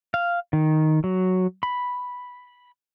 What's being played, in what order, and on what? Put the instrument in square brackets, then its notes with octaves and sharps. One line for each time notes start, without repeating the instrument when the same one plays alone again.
[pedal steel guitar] F5
D#3
F#3
B5